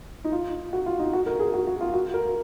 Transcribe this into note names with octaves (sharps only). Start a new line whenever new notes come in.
D#4
F4
F#4
F4
D#4
F#4
A#4
G#4
F#4
F#4
F4
F#4
A#4